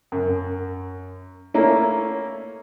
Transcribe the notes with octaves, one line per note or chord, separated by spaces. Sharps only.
F#2
A3 A#3 C#4 E4